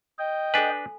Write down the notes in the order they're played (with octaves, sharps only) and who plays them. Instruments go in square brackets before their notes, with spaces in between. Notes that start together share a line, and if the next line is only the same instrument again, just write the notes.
[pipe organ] D#5 G5
[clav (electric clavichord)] D4 B4 [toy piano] A4 G#5